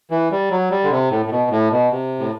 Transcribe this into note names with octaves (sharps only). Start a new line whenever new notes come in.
E3
G3
F#3
G3
D3
C3
A2
A2
B2
A2
B2
C3
A2